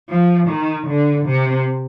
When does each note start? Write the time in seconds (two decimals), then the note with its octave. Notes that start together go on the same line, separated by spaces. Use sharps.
0.10 F3
0.48 D#3
0.87 D3
1.26 C3